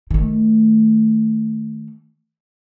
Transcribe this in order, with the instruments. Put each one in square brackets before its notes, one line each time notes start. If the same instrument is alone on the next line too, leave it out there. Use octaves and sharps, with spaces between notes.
[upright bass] D#3 A3